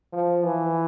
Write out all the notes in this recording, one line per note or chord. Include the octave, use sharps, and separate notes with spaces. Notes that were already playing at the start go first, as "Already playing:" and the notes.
F3
E3